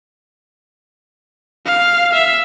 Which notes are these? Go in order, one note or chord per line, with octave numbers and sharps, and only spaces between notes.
F5
E5